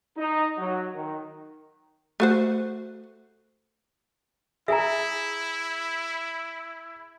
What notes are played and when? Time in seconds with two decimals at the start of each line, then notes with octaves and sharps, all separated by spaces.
0.17 D#4
0.57 F#3
0.95 D#3
2.20 A3 F#4 C5
4.68 E4 G#4 E5 G#5 A#5